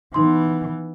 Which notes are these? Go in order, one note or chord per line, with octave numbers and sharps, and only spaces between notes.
E3 B3 D#4 C6